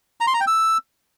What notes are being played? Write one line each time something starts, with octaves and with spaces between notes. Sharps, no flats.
A#5
C6
A#5
G5
E6